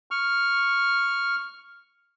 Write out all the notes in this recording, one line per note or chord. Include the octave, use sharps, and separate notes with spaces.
C#6 F6